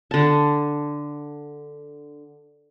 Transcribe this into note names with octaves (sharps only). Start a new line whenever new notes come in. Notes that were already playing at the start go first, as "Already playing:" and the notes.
D3 A5